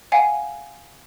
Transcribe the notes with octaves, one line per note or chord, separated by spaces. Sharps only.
F5 F#5 G#5